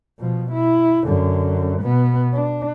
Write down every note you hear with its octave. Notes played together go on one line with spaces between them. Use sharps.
B2 F3
E4
F#2 D3
B2 B3
D4